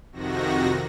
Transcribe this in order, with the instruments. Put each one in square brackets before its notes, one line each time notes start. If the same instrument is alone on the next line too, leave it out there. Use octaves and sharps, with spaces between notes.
[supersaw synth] F2 C3 D#3 F#4 A#6